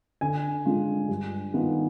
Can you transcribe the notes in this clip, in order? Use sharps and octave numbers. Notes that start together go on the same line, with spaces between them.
D3 G#5
G#3 D4 F4
G2
D#3 B3 F4